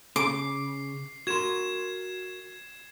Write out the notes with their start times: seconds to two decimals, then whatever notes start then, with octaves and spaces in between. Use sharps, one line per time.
0.16 C#3 D6 C7
1.27 F#4 A#4 C6 G#6 E7